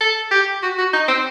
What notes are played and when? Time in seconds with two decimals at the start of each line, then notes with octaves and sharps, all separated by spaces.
0.01 A4
0.31 G4
0.63 F#4
0.78 F#4
0.93 D#4
1.08 C4